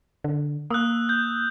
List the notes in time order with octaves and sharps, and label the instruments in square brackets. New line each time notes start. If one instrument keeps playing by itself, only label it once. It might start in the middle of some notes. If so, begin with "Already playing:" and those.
[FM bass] D3
[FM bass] A#3 [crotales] D#6 E6 F#6
[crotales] G6